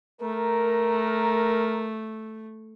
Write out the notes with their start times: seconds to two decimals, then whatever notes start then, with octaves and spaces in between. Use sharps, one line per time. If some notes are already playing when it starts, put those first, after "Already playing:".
0.21 A3 A#4